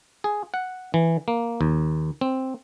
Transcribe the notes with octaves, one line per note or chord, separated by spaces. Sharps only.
G#4
F#5
E3
A#3
D#2
C4